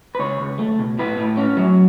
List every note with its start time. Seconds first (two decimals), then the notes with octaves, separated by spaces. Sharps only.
0.15 B4
0.19 C#2 C#5
0.40 C#2
0.59 A3
0.79 B2
0.99 A2 B4
1.17 A2
1.37 C#4
1.57 F#3